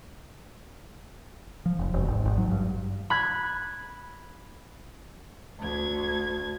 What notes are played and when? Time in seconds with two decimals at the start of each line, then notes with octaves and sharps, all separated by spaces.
1.66 F3
1.79 F1
1.94 E1
2.08 G#1
2.25 G#1
2.37 F#3
2.51 G2
3.10 B5 F#6 G#6
5.61 D2 G#6